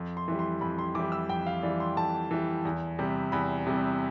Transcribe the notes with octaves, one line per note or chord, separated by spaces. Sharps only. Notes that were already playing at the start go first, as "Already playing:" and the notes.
Already playing: F2
C6
E3 G3
C6
F2 B5
C6
E3 G3 D6
E6
F2 G5
F5
E3 G3 D5
C6
F2 A5
E3 G3
E2
C3 G3
E2 B5
C3 G3